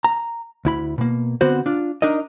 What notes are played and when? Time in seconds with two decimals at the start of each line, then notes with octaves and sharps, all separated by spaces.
0.04 A#5
0.65 D2 E4 B5
0.98 B2 A#3
1.41 D3 B3 C4 F#4 C5
1.66 D4 F4
2.02 D4 D#4 A#4 D#5